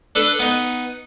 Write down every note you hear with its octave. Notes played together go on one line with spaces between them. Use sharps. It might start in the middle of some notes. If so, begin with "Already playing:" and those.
D4 A4 B4
B3 D#4